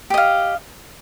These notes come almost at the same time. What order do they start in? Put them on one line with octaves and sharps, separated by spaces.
G4 D#5 F5